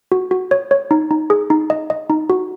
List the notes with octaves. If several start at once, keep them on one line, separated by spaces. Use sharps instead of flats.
F#4
F#4
C#5
C#5
D#4
D#4
G#4
D#4
D#5
D#5
D#4
F#4